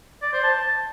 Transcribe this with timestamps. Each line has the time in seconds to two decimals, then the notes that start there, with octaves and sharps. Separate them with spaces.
0.22 D5
0.33 C5
0.43 A5